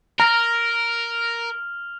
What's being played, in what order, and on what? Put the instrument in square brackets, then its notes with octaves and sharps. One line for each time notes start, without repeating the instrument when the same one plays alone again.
[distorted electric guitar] A#4 [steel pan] A#5 [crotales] F6 F7